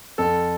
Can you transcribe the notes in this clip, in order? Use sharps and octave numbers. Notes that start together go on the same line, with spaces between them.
F2 A4